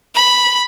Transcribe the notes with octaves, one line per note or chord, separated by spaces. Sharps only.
B5